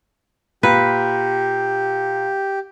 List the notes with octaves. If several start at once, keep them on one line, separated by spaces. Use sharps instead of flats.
A#2 G4 B4